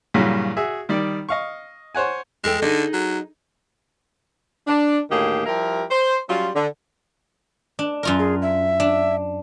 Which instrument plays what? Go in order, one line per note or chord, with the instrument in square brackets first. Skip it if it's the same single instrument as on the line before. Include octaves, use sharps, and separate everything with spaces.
[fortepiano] G2 A#2 C#3 E3 F#3
F#4 G#4 E5
D#3 G3 D5
D#5 F5 C#6
C5 C#5 F#5 G#5
[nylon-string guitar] E2 A4 G5 [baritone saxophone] G#3
[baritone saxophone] D3 [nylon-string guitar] D#4 G#4 D#5
[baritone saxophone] F#3
[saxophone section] D4
D2 A2 D#3 A#3 G4 G#4
F3 G3 E4 G4 A#4
C5
F#3 G3 C#4 F4
D3
[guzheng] D4
F#2 F4 A#4
[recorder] G#4
E5
[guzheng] D4